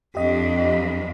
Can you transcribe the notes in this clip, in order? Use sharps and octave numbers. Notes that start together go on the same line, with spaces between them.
F2 D4 G4 D#5